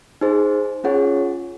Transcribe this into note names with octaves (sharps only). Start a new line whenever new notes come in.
D#4 G#4 C5
C#4 F4 G#4 C#5 F#5